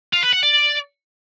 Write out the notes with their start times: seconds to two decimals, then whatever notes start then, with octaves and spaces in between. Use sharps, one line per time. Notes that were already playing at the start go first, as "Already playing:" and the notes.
0.13 F4
0.23 B4
0.33 F#5
0.43 D5